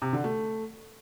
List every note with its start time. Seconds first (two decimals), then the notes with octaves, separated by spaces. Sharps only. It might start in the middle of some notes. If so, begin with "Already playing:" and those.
0.02 C3
0.13 D3
0.24 A3